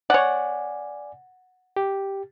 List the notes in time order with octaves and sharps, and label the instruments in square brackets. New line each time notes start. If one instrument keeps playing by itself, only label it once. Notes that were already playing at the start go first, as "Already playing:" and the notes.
[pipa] C#5 F#5 [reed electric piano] D5 G#5
[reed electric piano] G4